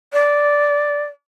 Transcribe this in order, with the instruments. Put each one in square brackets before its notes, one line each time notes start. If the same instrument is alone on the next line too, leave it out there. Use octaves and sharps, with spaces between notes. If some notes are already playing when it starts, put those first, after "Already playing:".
[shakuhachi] D5